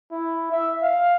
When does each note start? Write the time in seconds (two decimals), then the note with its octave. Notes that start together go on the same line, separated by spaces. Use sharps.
0.11 E4
0.52 E5
0.82 F5